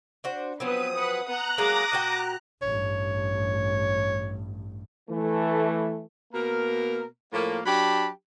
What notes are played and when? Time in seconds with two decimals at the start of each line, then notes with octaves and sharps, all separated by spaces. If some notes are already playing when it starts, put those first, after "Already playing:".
0.24 D4 F#4 C5
0.60 F3 F#3 B3 C4 B4 D#6
0.95 B4 F#5
1.27 B3 F#5 A#5 D#6 F#6
1.58 F#3 G#3 A#3 D6 D#6 A#6
1.92 A#2 F#4 G5
2.62 A1 G2 C#5
5.10 E3 A3
6.33 B2 A#3 A#4
7.32 A2 F3 A#3
7.65 F#3 D4 G4 A5 B5